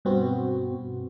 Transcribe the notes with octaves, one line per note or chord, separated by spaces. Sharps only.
G2 B2 B3 C4 F#4